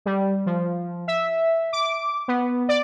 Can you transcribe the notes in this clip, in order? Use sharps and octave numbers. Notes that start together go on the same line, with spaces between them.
G3
F3
E5
D6
B3
D5